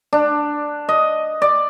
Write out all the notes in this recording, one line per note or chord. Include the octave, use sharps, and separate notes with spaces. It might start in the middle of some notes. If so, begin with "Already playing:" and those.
D4
D#5
D5